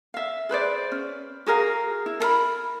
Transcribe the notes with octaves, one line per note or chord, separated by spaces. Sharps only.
E5 F5
G#4 B4 C5 D5
C#4
F#4 G#4 A#4 F5
E4
A4 A#4 B5